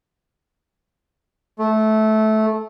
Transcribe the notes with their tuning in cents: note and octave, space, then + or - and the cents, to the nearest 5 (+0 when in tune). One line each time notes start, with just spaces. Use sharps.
A3 -15